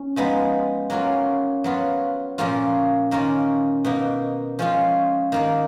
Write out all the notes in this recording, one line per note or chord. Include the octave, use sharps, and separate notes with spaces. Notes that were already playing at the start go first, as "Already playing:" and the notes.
Already playing: C#4
F3 G#3 B3 D#4
F#3 A#3 C#4 F4
F#3 B3 F4
A#2 F3 A#3 C#4 F4
D#3 A#3 C#4 F4
B2 A#3 D#4
F3 G#3 C#4 F4
D#3 A#3 D#4